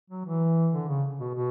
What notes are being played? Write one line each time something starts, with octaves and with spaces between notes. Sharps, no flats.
F#3
E3
D3
C#3
B2
B2